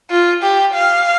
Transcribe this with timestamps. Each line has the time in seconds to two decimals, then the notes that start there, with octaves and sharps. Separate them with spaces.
0.10 F4
0.42 G4
0.75 F5